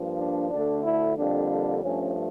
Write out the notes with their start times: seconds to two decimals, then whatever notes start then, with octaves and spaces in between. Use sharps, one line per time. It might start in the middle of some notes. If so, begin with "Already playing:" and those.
Already playing: G2 F3 A#3
0.18 D4
0.51 D2 D3 A3 D4
0.83 E4
1.16 F2 D3 G3 A#3 D4
1.82 G2 F3 A3 C#4